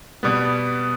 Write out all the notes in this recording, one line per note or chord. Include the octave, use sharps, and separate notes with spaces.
B2 G3 B3